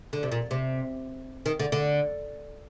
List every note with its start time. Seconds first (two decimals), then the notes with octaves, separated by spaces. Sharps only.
0.13 D3
0.23 C3
0.32 A#2
0.51 C3
1.46 D#3
1.60 D3
1.72 D3